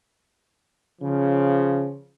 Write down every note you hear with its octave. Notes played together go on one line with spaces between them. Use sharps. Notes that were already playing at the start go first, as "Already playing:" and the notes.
C#3 F3